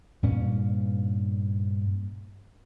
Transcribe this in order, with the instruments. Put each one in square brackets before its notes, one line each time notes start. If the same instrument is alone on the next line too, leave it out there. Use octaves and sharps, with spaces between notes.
[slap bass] G2 A#2 C#4